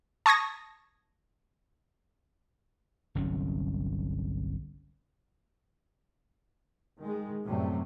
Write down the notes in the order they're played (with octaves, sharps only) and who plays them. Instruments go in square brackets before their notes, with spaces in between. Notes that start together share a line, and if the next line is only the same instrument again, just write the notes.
[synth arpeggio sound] A5 C#6 D#6 G#6 A#6
[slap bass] G1 C2 F#3 C#4
[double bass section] D#3 G#3
F#2 A2 C3 F#3 G3 A3